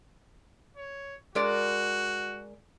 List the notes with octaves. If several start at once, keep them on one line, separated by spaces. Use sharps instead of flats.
C#5
G#3 F#4 A#4 D5